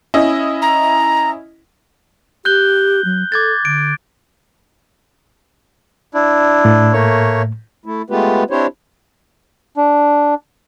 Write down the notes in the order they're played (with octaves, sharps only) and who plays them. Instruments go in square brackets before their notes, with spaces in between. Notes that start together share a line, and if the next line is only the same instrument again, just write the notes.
[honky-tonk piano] C#4 E4 D#5
[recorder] A#5
[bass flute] G4 [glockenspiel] F#6 G6 G7
[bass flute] F#3
[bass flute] A4 [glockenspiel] D6 G#6 A6
[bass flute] D3 [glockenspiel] D7
[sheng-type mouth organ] D4 E4
[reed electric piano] A2
[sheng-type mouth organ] A3 A#3 C#5
[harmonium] A3 E4
G#3 A3 B3 F4 G4 B4
C4 D4 E4 G4 C5 C#5
[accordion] D4